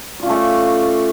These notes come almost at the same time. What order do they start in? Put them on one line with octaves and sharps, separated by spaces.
D5 F4 C#4 A3